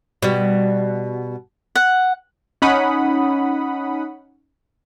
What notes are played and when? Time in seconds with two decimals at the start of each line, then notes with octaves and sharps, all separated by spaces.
0.22 B2 G3
1.76 F#5
2.62 C#4 D#4 F#5 B5 D#6